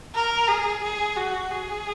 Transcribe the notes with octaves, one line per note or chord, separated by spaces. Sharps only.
A#4
G#4
G#4
F#4
G#4